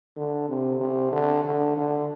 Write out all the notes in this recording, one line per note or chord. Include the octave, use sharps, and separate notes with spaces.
D3
C3
C3
D3
D3
D3